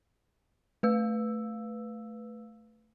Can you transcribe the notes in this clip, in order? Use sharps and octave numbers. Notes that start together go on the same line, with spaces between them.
A3 B4 F5 E6